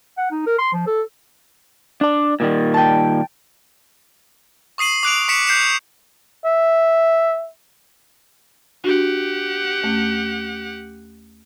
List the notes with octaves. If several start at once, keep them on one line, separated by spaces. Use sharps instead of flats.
F#5
D#4
A#4
C6
F3
A4
D4 D5
A#2 D#3 G3
G5 A5
C#6 D#6 C7 D#7 F#7
D6 F#6 D7 F7
C#6 B6 C#7 E7
F#6 G6 C7 C#7 E7
E5
D4 F#4 G4 F#5
D#2 A3 C#4